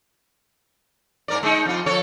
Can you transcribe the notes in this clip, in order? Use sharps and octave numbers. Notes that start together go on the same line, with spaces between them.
G#2 A#4 D5
G#3 D#4
F2 F4
F3 A4 C#5